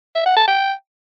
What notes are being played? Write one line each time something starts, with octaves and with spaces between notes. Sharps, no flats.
E5
F#5
A5
G5